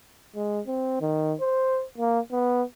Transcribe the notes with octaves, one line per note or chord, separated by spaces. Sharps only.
G#3
C4
D#3
C5
A#3
B3